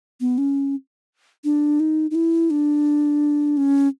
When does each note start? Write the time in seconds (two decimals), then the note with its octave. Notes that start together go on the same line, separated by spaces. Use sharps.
0.21 B3
0.38 C#4
1.44 D4
1.80 D#4
2.11 D#4
2.15 E4
2.50 D4
3.57 C#4